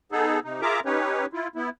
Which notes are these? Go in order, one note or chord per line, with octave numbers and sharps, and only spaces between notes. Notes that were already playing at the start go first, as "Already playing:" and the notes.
B3 D#4 G#4 A4
C3 D#4
F4 G#4 A#4 E5 A#5 D6
C#4 D#4 G4 B4 C#5
E4 F4
B3 E4